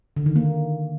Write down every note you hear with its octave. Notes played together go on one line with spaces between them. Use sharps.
D3
D#3
A#3